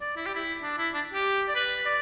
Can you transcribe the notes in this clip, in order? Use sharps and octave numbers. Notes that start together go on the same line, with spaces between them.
D5
E4
G4
E4
D4
E4
D4
G4
D5
B4
D5